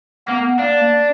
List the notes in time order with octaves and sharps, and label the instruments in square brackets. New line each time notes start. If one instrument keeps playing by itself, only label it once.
[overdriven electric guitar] A#3 [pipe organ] B3
[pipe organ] A#3 [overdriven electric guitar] D4